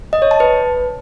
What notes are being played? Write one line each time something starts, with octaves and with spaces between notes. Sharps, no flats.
D#5
C#5
A5
B4